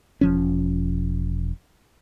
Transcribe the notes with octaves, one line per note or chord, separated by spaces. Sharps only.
E1 F3 C#4